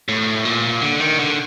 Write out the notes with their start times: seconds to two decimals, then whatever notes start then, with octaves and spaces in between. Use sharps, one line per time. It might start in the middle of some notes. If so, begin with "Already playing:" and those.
0.08 A2
0.45 A#2
0.82 D3
1.00 D#3
1.19 D3